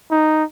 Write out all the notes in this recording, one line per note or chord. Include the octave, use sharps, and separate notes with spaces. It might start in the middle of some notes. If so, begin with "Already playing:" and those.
D#4